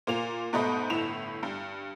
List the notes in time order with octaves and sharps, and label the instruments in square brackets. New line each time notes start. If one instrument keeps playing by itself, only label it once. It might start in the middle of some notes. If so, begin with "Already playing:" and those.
[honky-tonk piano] A#2 A#3 F7
G#2 B2 A3 D#4 D#5 B5
G1 A2 E7 F7
G2